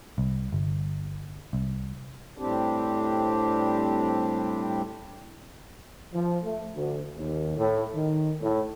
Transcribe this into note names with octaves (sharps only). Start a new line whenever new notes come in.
C2
G1
C2
A2 G3 C4 D4 G4
F3
A3
D2
D#2
A2
D#3
A2